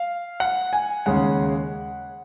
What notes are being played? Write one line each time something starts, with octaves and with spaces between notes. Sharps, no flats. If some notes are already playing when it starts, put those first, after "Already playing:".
Already playing: F5
F#5
G#5
D#2 C#3 G#3 F#5